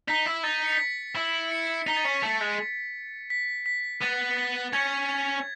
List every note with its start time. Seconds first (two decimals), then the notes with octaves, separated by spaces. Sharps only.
0.08 D#4 B6
0.26 E4
0.43 D#4 A6
0.64 C#7
0.72 B6
0.79 A6
1.15 E4 B6
1.51 C#7
1.87 D#4 B6
1.97 A6
2.05 C#4 B6
2.23 A3
2.41 G#3
3.30 B6
3.66 B6
4.01 B3 A6
4.37 B6
4.73 C#4 G#6
5.09 G#6